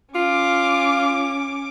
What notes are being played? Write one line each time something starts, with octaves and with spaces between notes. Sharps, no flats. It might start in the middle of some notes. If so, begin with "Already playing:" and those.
C#4 F4 D6